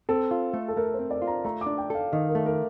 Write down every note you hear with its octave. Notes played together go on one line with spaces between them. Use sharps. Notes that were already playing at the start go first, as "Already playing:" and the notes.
C4 A4
F4
A3
A4
A3 A#4
C5
C4
D5
F4
A#5
A3 A#5
D6
D4
G5
A4 F5
D#3 D#5
A#4
A3
A#4